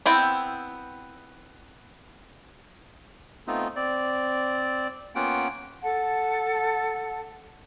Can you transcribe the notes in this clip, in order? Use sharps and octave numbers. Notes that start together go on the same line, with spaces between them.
B3 C4 E4 G5
A3 B3 C4 D#4 F4
C4 D5
A#3 B3 C#4 F4 F#5 G5
A4 F#5 A5